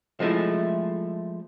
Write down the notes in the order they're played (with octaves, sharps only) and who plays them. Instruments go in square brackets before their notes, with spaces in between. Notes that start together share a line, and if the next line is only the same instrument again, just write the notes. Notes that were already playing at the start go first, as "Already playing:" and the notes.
[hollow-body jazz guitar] F3 G#3 A3 E4